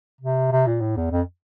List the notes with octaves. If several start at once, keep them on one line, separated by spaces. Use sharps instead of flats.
C3
C3
A#2
A2
E2
F2